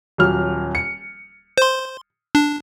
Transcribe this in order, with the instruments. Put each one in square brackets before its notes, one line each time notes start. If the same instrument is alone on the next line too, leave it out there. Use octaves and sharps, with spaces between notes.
[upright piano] D#1 F#3 F6
C#7
[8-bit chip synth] C5 C6
D4